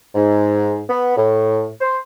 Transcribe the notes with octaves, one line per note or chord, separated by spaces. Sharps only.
G#2
B3
A2
C5